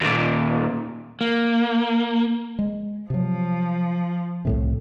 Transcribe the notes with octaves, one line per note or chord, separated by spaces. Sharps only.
D#2 A#2
A#3
G#3
C3 F3 F#3
C2 A2 C3